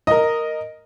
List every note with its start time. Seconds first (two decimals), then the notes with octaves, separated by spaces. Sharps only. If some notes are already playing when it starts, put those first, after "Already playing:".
0.07 A#4 D#5